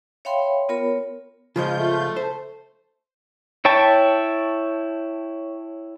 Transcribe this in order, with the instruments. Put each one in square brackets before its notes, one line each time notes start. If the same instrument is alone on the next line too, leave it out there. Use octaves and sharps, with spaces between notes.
[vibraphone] C#5 E5 F5 G5 B5 C6
B3 F4 A#4 C#5 B5
[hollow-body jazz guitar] C#3 F3 G#3 [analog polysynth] F4 G6
[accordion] A3
[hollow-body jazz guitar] C5
[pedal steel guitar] E4 C#5 G5 A5 C#6